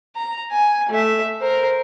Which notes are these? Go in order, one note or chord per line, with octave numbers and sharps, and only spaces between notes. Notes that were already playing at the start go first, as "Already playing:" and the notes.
A#5
G#5
A3 E5
A#4 C5